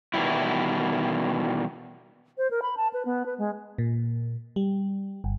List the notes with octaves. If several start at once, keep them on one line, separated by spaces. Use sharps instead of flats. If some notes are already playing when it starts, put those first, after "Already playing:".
B2 D#3 E3 G3 E4
C5
A#4
B5
A5
B4
B3
B4
G#3
A#2
G3
G1